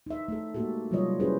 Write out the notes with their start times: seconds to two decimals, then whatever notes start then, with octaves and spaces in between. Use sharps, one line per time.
0.07 D#4 E5
0.28 A3 A4
0.54 G#3 A#3 F#4 G4 A4
0.91 C3 F#3 G3 F4 C#5 D#5
1.20 C#4 E4 G4 G#4 B4 C5